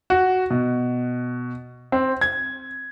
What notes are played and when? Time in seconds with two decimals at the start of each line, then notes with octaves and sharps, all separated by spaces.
0.10 F#4
0.50 B2
1.92 C4
2.21 G#6